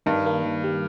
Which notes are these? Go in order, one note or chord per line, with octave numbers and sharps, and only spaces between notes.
G2 D#3
A#3
D#3
G3